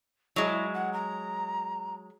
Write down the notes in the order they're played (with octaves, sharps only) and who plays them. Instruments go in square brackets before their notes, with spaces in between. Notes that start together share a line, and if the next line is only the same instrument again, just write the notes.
[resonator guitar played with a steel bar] F#3 G#3 [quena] E4
[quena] F#5
A#5